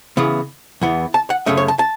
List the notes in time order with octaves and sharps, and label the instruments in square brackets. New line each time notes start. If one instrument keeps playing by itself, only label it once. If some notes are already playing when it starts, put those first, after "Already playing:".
[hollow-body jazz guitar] C#3 E3 B3
E2 E3 B3
A5
F#5
F#2 C#3 A3 C#4 E5
C#5
A5
A5